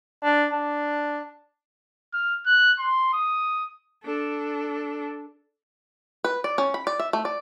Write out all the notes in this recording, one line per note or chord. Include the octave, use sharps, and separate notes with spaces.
D4
D4
F6
F#6
C6
D#6
D4 A4
B4
D5
C#4
B5
D5
E5
A3
D5